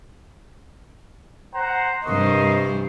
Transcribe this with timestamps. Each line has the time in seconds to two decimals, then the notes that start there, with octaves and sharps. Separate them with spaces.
1.54 C5 F#5 A#5
2.05 G2 C3 A#4 C5 D#5 C#6